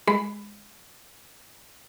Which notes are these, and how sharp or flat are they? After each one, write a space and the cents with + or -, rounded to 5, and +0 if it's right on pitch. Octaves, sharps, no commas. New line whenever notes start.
G#3 -10 B5 +20